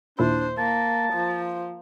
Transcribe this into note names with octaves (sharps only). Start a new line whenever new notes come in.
D#2 A#2 D4 E4 C5
A#3 A5
F3